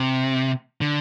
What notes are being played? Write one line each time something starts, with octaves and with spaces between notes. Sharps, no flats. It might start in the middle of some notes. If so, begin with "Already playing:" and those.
Already playing: C3
D3